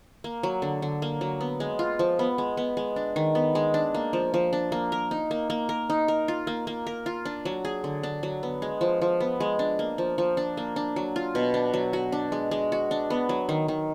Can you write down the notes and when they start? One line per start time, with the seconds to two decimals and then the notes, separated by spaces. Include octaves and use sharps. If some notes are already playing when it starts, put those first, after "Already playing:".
0.24 A#3
0.43 F#3
0.62 D3
0.82 D3
1.02 A#3
1.21 F#3
1.41 B3
1.60 G#3
1.79 F4
1.99 F3
2.19 B3
2.38 G#3
2.57 B3
2.77 G#3
2.96 D4
3.16 D#3
3.35 B3
3.55 G#3
3.74 D4
3.94 A#3
4.13 F3
4.34 F3
4.53 D4
4.72 A#3
4.92 A#4
5.11 D#4
5.31 A#3
5.50 A#3
5.69 A#4
5.90 D#4
6.08 A#4
6.28 F4
6.47 A#3
6.67 A#3
6.87 A#4
7.06 F4
7.25 D4
7.45 F#3
7.65 G#4
7.84 D3
8.03 D4
8.23 F#3
8.43 B3
8.62 G#3
8.81 F3
9.02 F3
9.20 B3
9.40 G#3
9.59 D4
9.79 A#3
9.98 F3
10.18 F3
10.37 D4
10.57 A#3
10.76 D4
10.96 F#3
11.16 F4
11.35 B2
11.54 D4
11.74 F#3
11.93 F#4
12.12 D4
12.32 G#3
12.51 G#3
12.72 F#4
12.91 D4
13.10 B3
13.29 F#3
13.49 D#3
13.68 D#3